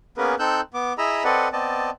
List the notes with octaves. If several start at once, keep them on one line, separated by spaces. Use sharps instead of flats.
A#3 B3 C#4 G#4 A#4 B4
C4 D#4 A4 E6 F#6 G6
B3 D6
E4 G#4 D#5 A#5 B5 E6
C4 A4 B4 D5 D#5 F#5
B3 C4 D5 D#5 A5